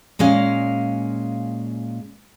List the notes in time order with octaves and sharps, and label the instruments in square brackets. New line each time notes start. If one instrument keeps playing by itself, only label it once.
[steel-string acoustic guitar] A#2 G#3 C#4 F5